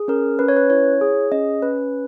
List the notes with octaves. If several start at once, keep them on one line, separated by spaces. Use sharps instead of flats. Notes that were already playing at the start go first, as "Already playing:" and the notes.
Already playing: G#4
C#4 A#4
C#4 B4
C#5
B4
E4 C#5
G#4
C#4 D#5
C#4 B4